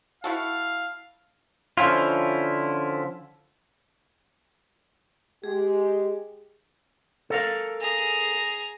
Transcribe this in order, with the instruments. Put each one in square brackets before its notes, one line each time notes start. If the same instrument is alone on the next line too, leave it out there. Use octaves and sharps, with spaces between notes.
[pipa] E4 F#4 A4 [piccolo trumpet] F5
[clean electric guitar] D3 F3 C#4 E4 F4
[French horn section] G#3 G4 [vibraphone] G#4
[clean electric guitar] A4 A#4 F5
[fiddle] G#4 A#5